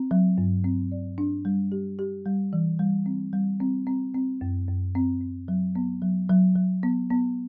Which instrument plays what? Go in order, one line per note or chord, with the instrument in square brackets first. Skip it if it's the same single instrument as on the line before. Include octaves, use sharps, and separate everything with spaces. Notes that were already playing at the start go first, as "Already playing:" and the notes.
Already playing: [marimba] C4
F#3
G2
C4
D5
D4
G3
G4
G4
G3
E3
G3
C4
G3
C4
C4
C4
F#2
F#2
C4
C4
F#3
B3
F#3
F#3
F#3
B3
B3